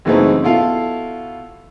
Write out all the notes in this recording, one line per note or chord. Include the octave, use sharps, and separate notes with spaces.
F#2 C#3 E3 A3 C4 D#4
B2 E4 F4 A4 F5